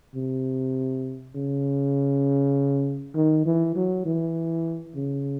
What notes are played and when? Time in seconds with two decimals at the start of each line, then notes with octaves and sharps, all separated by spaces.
0.15 C3
1.35 C#3
3.15 D#3
3.45 E3
3.76 F#3
4.05 E3
4.95 C#3